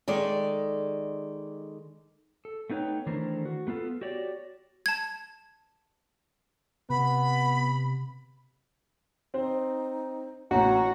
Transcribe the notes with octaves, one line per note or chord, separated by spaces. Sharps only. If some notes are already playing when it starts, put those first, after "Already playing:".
D#3 G#3 A4 D5
A4
A3 B3 D#4 B4 C#5 G5
D#3 E3 A3 D4 A#4 C5
F#4
A3 B3 F4 A4 B4
F#4 G4 C#5 D5
A5 G#6
C3 B3 B5
C4 D#4 C5
A1 A2 F#4 C#5 A#5